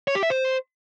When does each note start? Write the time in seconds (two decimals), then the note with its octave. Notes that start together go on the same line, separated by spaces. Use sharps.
0.08 C#5
0.15 G4
0.23 E5
0.30 C5